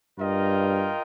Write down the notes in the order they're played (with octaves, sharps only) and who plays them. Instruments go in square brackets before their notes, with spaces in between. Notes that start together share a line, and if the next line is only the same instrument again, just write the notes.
[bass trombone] G2 [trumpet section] F4 A#4 D#5 G5